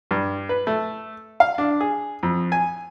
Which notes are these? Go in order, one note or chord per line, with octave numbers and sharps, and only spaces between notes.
G2
B4
A3
F5
D4
G#4
F2
G#5